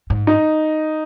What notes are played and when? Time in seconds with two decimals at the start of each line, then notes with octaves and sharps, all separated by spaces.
0.10 G#2
0.27 D#4